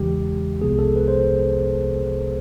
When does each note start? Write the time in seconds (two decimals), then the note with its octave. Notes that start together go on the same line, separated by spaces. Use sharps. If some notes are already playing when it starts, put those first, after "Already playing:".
Already playing: E2 C#3 E3 G#3 G4
0.61 C2 C3 F3 G#3 B3 G#4
0.79 A4
0.96 B4
1.08 C5